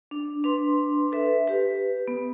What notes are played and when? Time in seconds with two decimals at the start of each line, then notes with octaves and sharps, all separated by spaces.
0.11 D4
0.44 D4 B4 C6
1.12 A4 B4 E5
1.47 G4 B4
2.08 B3